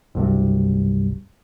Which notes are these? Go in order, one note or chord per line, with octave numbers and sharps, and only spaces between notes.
F#1 C2 G2